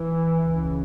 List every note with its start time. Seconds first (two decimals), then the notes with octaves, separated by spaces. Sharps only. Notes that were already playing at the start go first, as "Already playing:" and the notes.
Already playing: E3
0.42 C#2 C#3